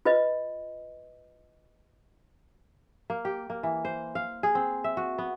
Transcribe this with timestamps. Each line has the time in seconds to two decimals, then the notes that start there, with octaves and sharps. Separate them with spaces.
0.05 F4 B4 D#5
3.10 A#3
3.25 G4
3.50 A#3
3.63 E3
3.85 C5
4.15 F5
4.43 G#4
4.55 C4
4.84 E5
4.97 F#4
5.18 B3